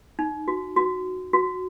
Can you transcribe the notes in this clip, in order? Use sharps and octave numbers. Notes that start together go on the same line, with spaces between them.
D#4
F#4
F#4
F#4